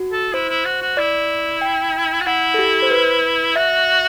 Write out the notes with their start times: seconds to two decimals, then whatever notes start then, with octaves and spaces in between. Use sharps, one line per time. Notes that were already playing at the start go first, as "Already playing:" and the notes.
Already playing: F#4
0.12 A4
0.33 E4 C5
0.49 E4
0.65 F#4
0.82 F#4
0.97 E4 D5
1.61 G5
2.21 F#4
2.26 E4 F#5
2.54 A4
2.59 G4
2.83 C5
2.91 B4
3.56 F#4 E5